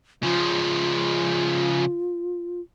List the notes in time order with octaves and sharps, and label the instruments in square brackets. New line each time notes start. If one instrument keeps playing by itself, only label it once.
[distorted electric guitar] C#3 F3 [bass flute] F4